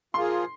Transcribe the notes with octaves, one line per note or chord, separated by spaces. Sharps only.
F3 A#3 F4 G#4 C6